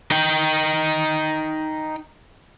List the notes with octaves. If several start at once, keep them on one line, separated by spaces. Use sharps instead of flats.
D#4 G5